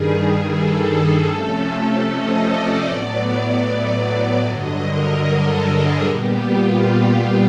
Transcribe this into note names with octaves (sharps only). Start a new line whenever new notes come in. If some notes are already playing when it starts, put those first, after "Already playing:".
Already playing: G2 D#3 G3 G#4
A4
C3 F3 A3 C#4
D#5
D5
A2 F#3 B3
G2 D3 F#3 D#5
A#4
A4
G#4
A#2 G3 B3 G4
F4
F4